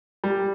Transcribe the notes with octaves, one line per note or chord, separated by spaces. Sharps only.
G3